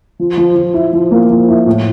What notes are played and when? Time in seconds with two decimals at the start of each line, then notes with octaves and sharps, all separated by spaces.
0.19 F3
0.37 F3
0.56 F3
0.74 E4
0.93 F3
1.11 A#3
1.30 F3
1.48 E4
1.67 A2